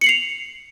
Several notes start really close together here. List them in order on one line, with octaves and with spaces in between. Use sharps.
C#7 F#7 C7 F7